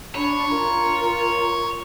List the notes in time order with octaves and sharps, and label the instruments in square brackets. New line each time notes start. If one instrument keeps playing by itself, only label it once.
[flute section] D4 B5 [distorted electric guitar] C#5
[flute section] F4 A#4 A#5